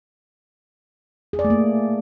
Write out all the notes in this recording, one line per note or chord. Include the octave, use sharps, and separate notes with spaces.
G#4
D5
A3
A#3